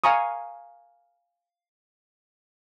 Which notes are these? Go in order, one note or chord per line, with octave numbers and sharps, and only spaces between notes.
F5 G#5 A#5 C#6 D#6